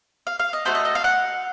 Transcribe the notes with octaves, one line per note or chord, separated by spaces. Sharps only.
F5
F5
D#5
A3 D#4 F#4 A4 C5
D#5
D#5
F5
F#5